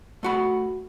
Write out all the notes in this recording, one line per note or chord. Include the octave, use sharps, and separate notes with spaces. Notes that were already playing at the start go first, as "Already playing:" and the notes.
A3 F#4 B5